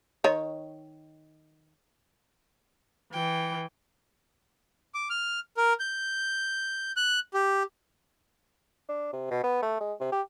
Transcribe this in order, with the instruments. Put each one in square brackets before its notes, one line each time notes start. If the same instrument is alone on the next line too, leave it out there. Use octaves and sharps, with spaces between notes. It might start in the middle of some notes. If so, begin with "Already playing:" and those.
[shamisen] D#3 C#5
[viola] E3 [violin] G5
[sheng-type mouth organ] D6
F6
A#4
G6
F#6
G4
[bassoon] D4
C3
B2
B3
A3
G#3
C3
G4